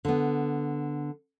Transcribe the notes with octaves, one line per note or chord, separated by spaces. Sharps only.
D3 B3